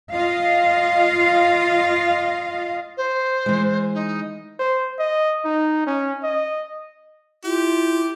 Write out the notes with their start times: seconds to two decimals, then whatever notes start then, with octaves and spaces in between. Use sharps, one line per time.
0.12 F4 D#5 F5
2.97 C5
3.46 E3 G#3
3.94 D#4
4.59 C5
4.99 D#5
5.45 D#4
5.86 C#4
6.23 D#5
7.45 E4 F4 G4